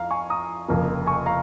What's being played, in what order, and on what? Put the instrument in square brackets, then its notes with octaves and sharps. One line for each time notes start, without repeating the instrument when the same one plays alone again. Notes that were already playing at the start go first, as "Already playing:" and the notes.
Already playing: [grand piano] F2 F5 A#5
G#5 C#6
A#5 D#6
F1 F2 C#3 F3 A#3
G#5 C#6
F5 A#5